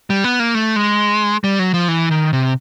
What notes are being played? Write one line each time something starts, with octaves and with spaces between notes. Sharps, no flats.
G3
B3
A#3
A3
G#3
G3
F#3
F3
E3
D#3
C3